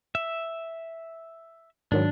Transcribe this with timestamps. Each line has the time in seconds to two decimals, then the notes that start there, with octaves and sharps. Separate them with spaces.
0.15 E5
1.92 G#2 D#3 F#3 D4